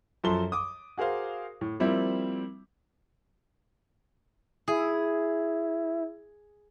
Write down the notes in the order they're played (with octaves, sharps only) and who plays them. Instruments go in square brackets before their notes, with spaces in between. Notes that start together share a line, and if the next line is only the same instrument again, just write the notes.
[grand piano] F#2 F3 A4 C6 G7
D6 D#6
F#4 G#4 A#4 C5 F5
A2
F3 G3 A#3 C4 E4
[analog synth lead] E4 [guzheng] G#4